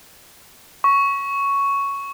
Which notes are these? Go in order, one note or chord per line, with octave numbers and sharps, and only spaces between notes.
C#6